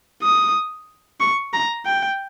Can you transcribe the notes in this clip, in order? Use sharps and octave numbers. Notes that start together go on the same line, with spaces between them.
D#6
C#6
A#5
G5